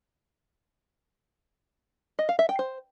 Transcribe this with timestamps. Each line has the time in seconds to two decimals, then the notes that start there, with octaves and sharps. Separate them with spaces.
2.19 D#5
2.29 F5
2.39 E5
2.49 G5
2.59 C5